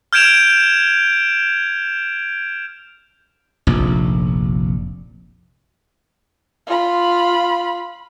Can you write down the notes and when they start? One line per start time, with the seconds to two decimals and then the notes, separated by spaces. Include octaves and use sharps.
0.13 F6 G6 G#6 D7 E7 F7
3.67 F1 A#1
6.66 F4 B5